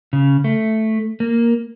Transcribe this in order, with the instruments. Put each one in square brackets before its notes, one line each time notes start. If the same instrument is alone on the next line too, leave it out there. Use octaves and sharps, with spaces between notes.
[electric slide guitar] C#3
A3
A#3